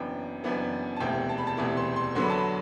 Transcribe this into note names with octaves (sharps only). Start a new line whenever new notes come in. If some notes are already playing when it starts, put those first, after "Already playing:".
Already playing: F#1 F#2 E3 B3 D4 G5
F#1 F#2 E3 B3 D4
A5
E1 D2 C3 E3 G5
A5
B5
A5
E1 D2 C3 E3
C6
C6
E2 D3 F#3 B3 C6
B5
A5
B5